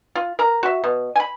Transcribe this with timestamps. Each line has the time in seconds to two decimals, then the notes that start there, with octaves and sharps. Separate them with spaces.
0.15 F4
0.39 A#4 A#5
0.63 F#4 E5
0.84 B2
1.16 G#5 B5